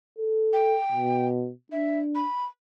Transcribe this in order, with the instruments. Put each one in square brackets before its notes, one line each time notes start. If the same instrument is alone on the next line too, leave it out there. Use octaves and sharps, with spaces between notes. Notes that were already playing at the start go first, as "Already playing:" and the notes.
[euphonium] A4
[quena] G5
[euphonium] B2
[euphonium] D4 [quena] E5
[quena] B5